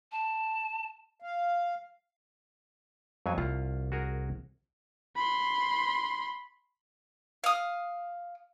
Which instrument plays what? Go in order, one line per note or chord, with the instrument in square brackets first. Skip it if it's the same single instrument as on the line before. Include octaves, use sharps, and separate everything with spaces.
[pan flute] A5
[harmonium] F5
[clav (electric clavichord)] F2 F#3 G#5
[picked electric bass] C2 [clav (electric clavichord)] F4
[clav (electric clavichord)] F#4 G#4 A#4
[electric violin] B5 C6
[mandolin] F5 D#6